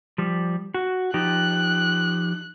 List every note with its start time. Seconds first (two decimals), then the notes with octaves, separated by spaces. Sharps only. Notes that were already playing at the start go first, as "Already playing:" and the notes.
0.18 F3 G3
0.74 F#4
1.14 F3 D#4 G4 F#6